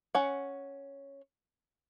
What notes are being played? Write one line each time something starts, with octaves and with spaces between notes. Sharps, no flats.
C#4 F#5